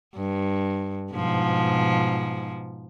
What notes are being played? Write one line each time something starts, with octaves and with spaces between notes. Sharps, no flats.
G2
G#2 B2 F3